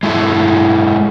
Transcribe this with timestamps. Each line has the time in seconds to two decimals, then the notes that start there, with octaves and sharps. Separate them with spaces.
0.03 G#3 E4 G#4 A4